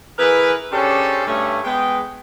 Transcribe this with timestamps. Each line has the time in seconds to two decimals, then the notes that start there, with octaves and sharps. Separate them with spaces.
0.18 E3 G#4 A#4 B4
0.72 C#3 C#4 D4 G4 A4 C5
1.26 G2 A3 C#4
1.64 G#3 B3 G5